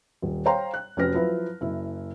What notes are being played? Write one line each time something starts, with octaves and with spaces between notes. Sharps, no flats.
D#1
C5 C#5 F5 G5 A#5 C6
F#6
F1 C#4 F#4 B4 F6 A#6
F3 F#3 E4 B4
F#1 E4